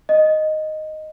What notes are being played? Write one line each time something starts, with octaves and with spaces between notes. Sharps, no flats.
D#5